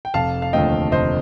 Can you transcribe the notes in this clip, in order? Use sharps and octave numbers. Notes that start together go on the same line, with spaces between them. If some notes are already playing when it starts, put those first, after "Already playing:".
G5
F1 F5 A5
F5
D#2 D3 F3 A3 D#5 G5
F1 C5 D#5